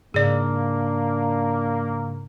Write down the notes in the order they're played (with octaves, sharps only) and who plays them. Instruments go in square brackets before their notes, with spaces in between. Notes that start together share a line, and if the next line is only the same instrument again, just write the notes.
[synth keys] G#2 C#3 [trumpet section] A#3 [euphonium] D4 [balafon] G#4 D5